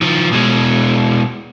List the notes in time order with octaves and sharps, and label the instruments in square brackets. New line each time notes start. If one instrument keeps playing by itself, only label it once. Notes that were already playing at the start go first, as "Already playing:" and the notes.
[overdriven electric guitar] D#3 F3
B2 G#3